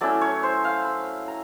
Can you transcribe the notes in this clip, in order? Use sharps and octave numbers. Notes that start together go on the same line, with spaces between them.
F#3 A3 C#4 E4 D5
C#5
C5
F5
B5
A#5